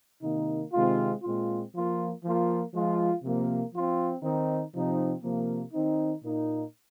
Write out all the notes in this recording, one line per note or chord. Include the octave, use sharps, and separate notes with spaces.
C3 D#3 A#3 D#4
C3 D#3 G#3 C4 F4
A#2 G#3 C4 F4
F3 A#3 F4
F3 A#3 F4
F3 G#3 F4
C3 F3 A#3
F3 C4 F4
D#3 C4 D#4
C3 F3 C4 D#4
C3 F3 A#3
D#3 C4 D#4
A#2 A#3 D#4